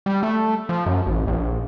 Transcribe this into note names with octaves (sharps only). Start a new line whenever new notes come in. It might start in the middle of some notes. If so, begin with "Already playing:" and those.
G3
A3
F3
F#2
A1
A#1